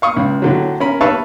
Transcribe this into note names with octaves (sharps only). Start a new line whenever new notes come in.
F5 C#6 D#6
C#2
A2 D3 F#3
C#4 A#4 B5
B4 C#5 E5 F5 A5 C#6